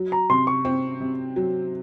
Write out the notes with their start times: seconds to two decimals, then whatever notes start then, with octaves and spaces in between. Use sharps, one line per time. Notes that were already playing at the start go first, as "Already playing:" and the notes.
Already playing: F#3
0.12 A#5
0.30 C3 C6
0.47 C#6
0.65 C4
1.00 C3
1.36 F#3